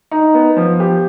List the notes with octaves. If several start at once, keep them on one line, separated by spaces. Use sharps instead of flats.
D#4
B3
F3
G4